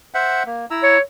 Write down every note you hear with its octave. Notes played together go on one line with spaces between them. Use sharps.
C5 E5 F#5
A#3
E4 A#5 E6
C#5